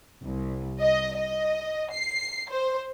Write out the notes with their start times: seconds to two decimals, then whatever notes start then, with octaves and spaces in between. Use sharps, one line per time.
0.23 C2
0.81 D#5
1.17 D#5
1.93 C7
2.50 C5